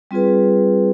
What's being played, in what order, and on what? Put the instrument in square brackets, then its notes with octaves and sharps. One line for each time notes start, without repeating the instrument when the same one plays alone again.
[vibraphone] G3 C4 F4 G#4 B4